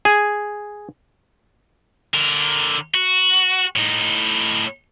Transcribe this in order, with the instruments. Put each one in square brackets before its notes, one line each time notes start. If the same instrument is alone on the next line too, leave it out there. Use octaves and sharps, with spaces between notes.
[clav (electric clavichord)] G#4
[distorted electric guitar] D3 A#4
F#4
A2 D#4